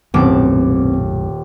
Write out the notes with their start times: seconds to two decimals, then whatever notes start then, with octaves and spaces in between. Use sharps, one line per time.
0.14 D#1 B1 F#2 A2 B3 C4 D6